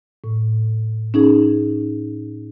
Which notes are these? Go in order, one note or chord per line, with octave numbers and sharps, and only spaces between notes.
A2
C#4 D#4 G#4